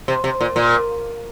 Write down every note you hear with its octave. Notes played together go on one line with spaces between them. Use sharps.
C3
C3
A#2
A#2